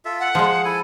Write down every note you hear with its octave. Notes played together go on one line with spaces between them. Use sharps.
F4 A4 E5
F#5
F3 G#3 G#4 C5 F5
E4 A4 G#5